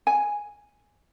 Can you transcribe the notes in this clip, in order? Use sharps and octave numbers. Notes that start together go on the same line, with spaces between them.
G#5